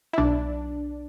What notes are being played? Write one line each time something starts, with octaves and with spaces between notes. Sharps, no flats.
E4
B1 D4